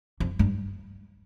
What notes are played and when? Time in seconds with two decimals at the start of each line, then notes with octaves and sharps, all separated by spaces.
0.20 F2
0.39 G2